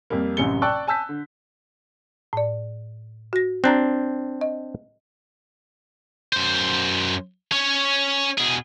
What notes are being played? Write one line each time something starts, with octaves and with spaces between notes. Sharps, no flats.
F2 G3 A#3
A1 F#2 C3 C#7 G7
D5 G5 A5 C#6 E6 F#6
G#5 A5 E6 G6 B6
D3
A2 D5
F#4 A#6
C4 D4 A#5 F#6
D#5
F#2 C5
C#4 C#5
B2 G#4